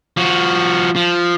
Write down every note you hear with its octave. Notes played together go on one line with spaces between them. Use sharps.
F3 F#4
F3